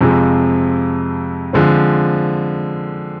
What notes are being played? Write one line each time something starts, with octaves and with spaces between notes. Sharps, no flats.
F2 C3 F3 G#3
D3 F3 G#3 C4